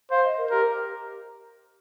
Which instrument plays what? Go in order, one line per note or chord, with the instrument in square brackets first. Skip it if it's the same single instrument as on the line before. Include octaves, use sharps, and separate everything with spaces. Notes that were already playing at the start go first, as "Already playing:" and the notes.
[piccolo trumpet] C5 [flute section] F5
[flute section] D#5
A#4
[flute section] G4 [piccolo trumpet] A#4